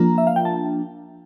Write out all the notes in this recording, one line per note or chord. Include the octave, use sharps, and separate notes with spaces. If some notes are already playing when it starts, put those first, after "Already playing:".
Already playing: F3 A#3 D4 F4 A#5
E5
F5
G5
A5